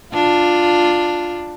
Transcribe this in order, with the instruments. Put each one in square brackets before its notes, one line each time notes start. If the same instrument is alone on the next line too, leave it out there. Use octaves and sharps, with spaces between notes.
[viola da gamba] D4 F4